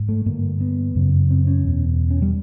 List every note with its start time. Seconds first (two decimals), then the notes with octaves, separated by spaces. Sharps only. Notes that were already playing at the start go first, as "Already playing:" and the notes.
Already playing: G#2
0.09 A3
0.26 G2 D3 A#3
0.61 B3
0.95 F#2 C#3
1.30 C4
1.47 C#4
1.64 E2 B2
2.10 C#4
2.22 G3